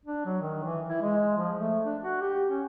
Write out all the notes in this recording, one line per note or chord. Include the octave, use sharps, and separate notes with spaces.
D4
F#3
D#3
E3
E4
G#3
F3
A3
D4
F#4
G4
C#4